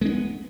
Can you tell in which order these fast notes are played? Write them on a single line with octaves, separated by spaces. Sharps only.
G#3 D4 B3